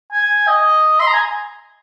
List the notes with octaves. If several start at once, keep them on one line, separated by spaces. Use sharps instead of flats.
G#5
D#5
C6
A#5
G#5